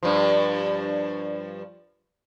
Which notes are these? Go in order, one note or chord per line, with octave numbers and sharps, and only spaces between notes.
G2 F3